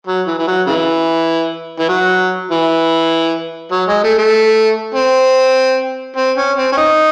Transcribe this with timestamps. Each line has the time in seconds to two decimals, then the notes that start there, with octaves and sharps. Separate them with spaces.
0.07 F#3
0.27 E3
0.39 E3
0.47 F#3
0.67 C#3 E3
1.79 E3
1.89 F#3
2.51 E3
3.72 F#3
3.88 G#3
4.03 A3
4.18 A3
4.95 C4
6.16 C4
6.37 C#4
6.57 C4
6.72 C#4
6.77 D#4